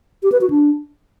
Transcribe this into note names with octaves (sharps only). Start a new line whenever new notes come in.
G4
B4
F#4
D4